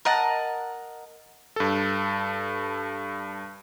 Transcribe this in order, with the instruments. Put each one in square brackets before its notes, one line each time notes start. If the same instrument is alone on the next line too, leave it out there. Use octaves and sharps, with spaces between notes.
[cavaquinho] A#4 D#5 F#5 A5
[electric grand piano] G2 A4